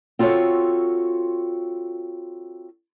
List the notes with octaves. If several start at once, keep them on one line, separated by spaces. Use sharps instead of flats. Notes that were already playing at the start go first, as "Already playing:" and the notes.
C4 F4 F#4 A4 C#5